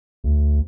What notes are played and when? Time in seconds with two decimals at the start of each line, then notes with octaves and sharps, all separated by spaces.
0.24 D2